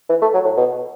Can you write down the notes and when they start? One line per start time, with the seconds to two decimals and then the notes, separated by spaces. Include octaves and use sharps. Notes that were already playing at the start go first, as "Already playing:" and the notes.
0.10 E3
0.22 A3
0.34 F#3
0.45 A2
0.57 B2